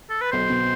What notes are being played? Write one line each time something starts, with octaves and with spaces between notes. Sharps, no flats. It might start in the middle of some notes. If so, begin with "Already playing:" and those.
A4
B4
B1 C5
B2